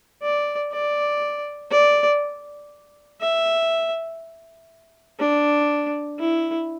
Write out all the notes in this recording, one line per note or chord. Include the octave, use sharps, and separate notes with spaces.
D5
D5
D5
E5
D4
E4